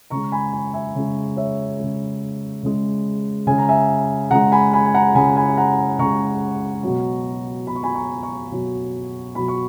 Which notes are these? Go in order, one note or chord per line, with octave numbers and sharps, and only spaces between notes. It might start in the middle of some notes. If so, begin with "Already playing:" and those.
C#3 G#3 A#5 C#6
G#5 B5
G#5 B5
E5 G#5
C#3 G#3
C#5 E5
C#3 G#3
C#3 G#3
C#3 G#3 G#5
A#5
E5 G#5
C#3 G#3 F#5 A#5
G#5 B5
G#5 B5
G#5
F#5 A#5
C#3 G#3 G#5 B5
G#5 B5
F#5 A#5
C#3 G#3 A#5 C#6
B2 F#3
B2 F#3 B5
C#6
G#5 B5
A#5 C#6
A#5 C#6
B2 F#3
B2 F#3 B5
C#6